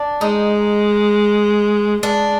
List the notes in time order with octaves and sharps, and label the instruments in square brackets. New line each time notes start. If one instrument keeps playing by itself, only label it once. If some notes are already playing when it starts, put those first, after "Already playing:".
Already playing: [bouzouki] D4
[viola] G#3 [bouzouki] D#4
[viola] G#3 [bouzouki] D4